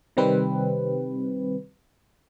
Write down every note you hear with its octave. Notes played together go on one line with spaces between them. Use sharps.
C3 D#3 G3 C4 B4